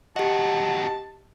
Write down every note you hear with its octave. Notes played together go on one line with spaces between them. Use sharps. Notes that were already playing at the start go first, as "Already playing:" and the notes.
D#2 F#4 G4 D#5 A5